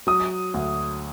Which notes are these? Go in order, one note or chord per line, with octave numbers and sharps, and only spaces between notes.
F#3 D#6
D2